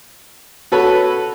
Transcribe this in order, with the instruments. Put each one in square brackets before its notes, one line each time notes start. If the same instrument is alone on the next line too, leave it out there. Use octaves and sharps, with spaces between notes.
[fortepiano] F#4 A4 B4 C#5